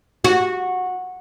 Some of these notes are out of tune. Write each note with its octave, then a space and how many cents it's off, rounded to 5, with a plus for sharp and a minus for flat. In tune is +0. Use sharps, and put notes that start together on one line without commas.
F#4 -15